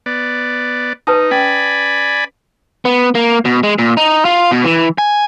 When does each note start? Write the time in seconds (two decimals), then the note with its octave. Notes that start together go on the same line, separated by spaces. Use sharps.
0.06 B3 D5
1.07 D#4 B4 A5 D#6
1.31 C#4 D5 G#5 B5
2.85 B3
3.15 A#3
3.45 B2
3.63 G#3
3.79 A#2
3.97 D#4
4.25 F4
4.51 B2
4.64 E3
4.98 G#5